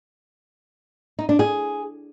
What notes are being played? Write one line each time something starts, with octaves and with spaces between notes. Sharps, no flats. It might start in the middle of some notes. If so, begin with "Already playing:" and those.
D#4
D4
G#4